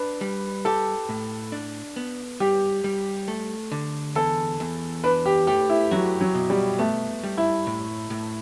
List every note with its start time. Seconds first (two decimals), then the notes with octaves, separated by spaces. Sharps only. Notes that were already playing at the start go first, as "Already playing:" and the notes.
Already playing: D4 B4
0.21 G3
0.65 G4 A4
1.09 A2
1.52 D4
1.96 B3
2.40 G3 G4
2.84 G3
3.28 A3
3.72 D3
4.15 E2 A4
4.60 E2
5.04 D4 B4
5.26 G4
5.47 A3 G4
5.69 E4
5.91 F#3 F#4
6.21 F#3
6.35 B2
6.50 G3
6.79 A3 B3
7.23 G3
7.38 E4
7.67 A2
8.10 A2